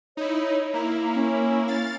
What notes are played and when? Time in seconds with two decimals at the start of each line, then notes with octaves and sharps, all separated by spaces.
0.17 D#4 E4 C#5
0.74 A#3 E4 A#5
1.15 C#4
1.68 F5 A6